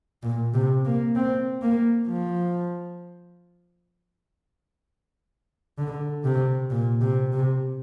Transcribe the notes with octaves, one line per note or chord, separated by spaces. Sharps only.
A#2
C3
A#3
C4
A#3
F3
D3
C3
A#2
C3
C3